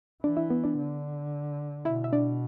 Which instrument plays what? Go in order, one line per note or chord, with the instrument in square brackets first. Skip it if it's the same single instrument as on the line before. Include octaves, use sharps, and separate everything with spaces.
[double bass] E3 [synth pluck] D4 D5
[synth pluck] E4 E5
B3 B4
D4 D5
[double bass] D3
[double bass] B2 [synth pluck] E4 E5
[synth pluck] E5
D4 D5